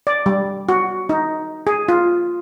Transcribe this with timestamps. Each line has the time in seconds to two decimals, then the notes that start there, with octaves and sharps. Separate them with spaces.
0.07 D5
0.26 G3
0.69 F#4
1.09 D#4
1.67 G#4
1.88 F4